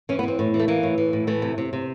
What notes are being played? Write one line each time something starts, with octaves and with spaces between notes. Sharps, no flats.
E3 C#4
B3
E3 C4
A2
E3
A3
E3 A#3
A2
E3
A2
E3 A3
C3
C3
C3